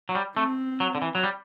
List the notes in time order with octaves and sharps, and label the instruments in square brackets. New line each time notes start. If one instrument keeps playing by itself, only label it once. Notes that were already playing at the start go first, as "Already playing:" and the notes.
[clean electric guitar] F#3
G3
[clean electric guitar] A3 [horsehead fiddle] C4
[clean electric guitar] F#3
D3
E3
F#3
G3